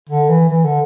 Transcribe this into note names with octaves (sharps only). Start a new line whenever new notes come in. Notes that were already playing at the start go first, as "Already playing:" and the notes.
D3
E3
E3
D3